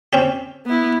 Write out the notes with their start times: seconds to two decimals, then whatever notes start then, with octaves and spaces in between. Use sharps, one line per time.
0.13 C4 C#4 G4
0.66 B3 E4